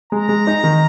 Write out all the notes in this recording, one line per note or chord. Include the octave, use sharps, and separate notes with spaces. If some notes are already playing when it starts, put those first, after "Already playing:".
G#3 A#5
G#3
D#4
D#3